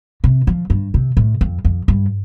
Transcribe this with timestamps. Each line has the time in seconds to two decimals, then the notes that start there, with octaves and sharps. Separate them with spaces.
0.24 C3
0.47 F3
0.70 G2
0.94 C3
1.17 A2
1.41 F2
1.65 F2
1.88 G2